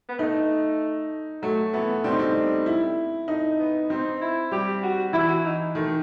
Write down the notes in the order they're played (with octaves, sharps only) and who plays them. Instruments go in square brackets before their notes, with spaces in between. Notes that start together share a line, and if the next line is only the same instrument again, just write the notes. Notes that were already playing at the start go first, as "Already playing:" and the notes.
[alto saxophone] B3
[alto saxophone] A3 [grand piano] D#4
[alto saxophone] F#3 [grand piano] A3
[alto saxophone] E3 [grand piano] B3
[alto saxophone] G3 [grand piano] C4
[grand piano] D#4
C4
E4
[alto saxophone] A3 [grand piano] D#4
[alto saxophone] B3
[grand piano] C4 [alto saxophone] D#4
[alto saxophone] E4
[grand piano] G3 [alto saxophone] G4
[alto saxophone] F#4
[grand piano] E3 [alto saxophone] E4
[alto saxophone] F#4
D#4
[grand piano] D#3 [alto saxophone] A3